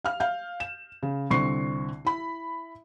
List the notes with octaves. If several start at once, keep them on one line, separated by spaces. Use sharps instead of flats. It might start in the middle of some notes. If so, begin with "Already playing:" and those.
F5 F6
F5 G6
E7
C#3
C2 D3 C4 C#6 C7
E4 B5